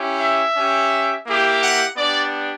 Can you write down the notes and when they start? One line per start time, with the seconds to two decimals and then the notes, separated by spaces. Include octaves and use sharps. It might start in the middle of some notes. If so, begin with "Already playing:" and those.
Already playing: C#4 E4 G4
0.21 E5
0.57 C#4 G4
1.27 A#3 E4 G4
1.62 F#5
1.96 B3 D4 G4 D5